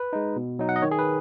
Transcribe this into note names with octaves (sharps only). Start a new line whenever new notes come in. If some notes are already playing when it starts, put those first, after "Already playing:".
Already playing: B4
G#3 D#4
B2
F#3 D#4
F#5
D#5
D#3 C#5
G#4
B4